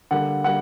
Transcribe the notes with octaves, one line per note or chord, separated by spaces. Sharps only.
D3 G3 A#3 F#5
G3 A#3 F#5